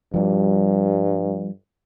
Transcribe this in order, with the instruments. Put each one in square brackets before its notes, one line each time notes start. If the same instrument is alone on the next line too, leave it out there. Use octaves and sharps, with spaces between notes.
[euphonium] G2 [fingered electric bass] F3 G3